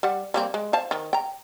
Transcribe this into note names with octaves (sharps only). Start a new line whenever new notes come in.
G3 F#5
G3 A#3 C4
G#3
C5 F5 A5
D#3
G5 A#5